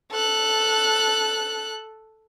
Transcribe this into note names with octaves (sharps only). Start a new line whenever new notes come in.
A4 F#6